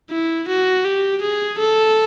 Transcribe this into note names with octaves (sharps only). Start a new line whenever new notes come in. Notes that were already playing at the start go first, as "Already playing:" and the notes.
E4
F#4
G4
G#4
A4